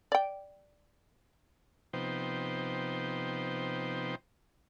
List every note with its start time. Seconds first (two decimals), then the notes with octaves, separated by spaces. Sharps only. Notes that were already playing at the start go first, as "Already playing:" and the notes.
0.12 D5 G5
1.93 C3 F3 B3 D#4 C5 G5